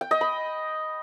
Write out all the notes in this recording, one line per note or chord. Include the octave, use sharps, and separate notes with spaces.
G5
D#5
B5